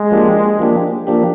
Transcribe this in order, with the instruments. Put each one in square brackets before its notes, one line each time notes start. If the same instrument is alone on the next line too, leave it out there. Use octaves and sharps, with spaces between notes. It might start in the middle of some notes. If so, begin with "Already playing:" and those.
Already playing: [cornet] G#3
[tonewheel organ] F3 A#3 D4 G4
F3 A#3 D4 G4
F3 A#3 D4 G4